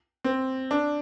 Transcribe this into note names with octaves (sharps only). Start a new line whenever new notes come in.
C4
D4